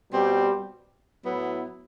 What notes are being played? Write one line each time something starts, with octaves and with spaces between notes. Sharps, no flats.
B2 G3 C4 G4
A2 F#3 B3 E4